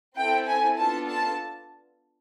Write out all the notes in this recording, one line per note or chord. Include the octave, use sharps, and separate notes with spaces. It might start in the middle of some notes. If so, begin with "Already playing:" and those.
C4 E4 A4 G5
G#5
B3 D4 F4 A4 A5
A5